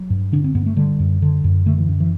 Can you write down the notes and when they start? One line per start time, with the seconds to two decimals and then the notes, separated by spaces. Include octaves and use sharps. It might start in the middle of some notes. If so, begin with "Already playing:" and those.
Already playing: F#3
0.10 G2
0.33 D3 D4
0.44 C4
0.55 G2 B3
0.66 A3
0.77 D3 G3
0.99 F#2
1.22 D3
1.44 F#2
1.66 D3 A3
1.77 E3
1.89 F#2
2.00 E3